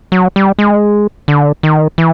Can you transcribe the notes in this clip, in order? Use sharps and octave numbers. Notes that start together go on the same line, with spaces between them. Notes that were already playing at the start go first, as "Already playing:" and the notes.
F#3
G3
G#3
D3
D#3
E3